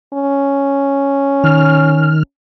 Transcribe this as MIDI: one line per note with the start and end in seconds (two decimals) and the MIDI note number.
0.13 2.20 61
1.44 2.23 51
1.44 2.23 89